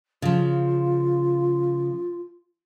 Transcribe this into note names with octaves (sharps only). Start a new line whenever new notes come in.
C#3 F3 F4